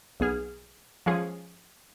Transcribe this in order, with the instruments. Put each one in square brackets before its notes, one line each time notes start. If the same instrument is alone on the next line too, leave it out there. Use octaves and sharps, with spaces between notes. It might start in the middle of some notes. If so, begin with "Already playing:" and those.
[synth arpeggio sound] B1 B3 G#4 F6
F3 G#3 C#4 G#4